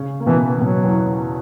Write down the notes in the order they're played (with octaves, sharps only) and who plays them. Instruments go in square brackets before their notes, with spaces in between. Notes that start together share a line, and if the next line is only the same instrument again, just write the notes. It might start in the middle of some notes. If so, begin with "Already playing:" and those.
Already playing: [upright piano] C#3 C#4
A#3
[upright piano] B2 B3 [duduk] E3
[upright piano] B2 B3 [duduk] F#3
[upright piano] E2 E3